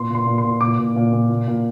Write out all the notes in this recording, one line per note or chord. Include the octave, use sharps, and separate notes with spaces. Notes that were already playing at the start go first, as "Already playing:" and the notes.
Already playing: A#2 C6
A#2 C6
A#2
C6
A#2
A#2 D6
A#2
A#2
A#2
A#2
A#2